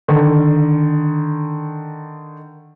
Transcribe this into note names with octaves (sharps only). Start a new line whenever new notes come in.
D3 D#3